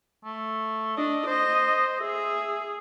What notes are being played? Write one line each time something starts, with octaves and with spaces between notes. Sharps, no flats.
A3
D4 D#5
C5 D#5
G#4 E5